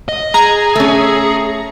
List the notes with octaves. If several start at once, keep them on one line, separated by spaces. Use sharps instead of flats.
D#5
G#4 A#5
A3 C#4